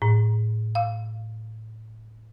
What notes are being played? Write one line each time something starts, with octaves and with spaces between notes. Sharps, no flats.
A2
F5